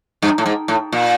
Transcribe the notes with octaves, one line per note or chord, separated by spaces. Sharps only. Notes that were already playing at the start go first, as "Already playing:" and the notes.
G2
A2
G#2
A2
A#2